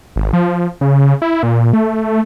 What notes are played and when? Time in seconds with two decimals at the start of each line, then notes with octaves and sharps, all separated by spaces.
0.16 G#1
0.33 F3
0.81 C#3
1.22 E4
1.43 A#2
1.73 A3